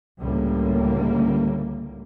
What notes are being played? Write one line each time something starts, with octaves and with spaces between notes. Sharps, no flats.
C#2 A2 D3 G3 A#3